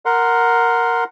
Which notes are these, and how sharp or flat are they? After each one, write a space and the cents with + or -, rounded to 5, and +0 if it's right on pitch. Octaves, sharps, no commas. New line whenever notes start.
A#4 +0 F#5 +0 C6 +0